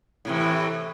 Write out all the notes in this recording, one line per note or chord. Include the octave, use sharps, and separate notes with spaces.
A2 C3 E3